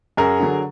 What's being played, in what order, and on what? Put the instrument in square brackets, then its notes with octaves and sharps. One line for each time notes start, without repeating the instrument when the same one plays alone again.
[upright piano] F#2 G#4 A#4
D3 F#3